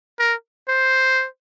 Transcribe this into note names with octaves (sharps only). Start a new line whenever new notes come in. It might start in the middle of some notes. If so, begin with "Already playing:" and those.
A#4
C5